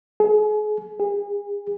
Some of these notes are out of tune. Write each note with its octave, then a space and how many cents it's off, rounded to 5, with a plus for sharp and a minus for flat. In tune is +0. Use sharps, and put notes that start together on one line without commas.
G#4 +35
G#4 -35